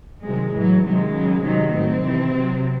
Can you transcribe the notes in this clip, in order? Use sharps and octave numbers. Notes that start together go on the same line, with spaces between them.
C3 D#3 F#3 G#3
A2 E3 F#3
C3 D#3 F#3 G#3
C#3 F#3
C3 D#3 F#3
A2 F#3 C4
C3 E3
C3 F#3